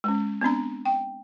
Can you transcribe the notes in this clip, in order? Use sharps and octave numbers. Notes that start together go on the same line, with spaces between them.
G#3 C#4
B3 C4 D4 A#5
G5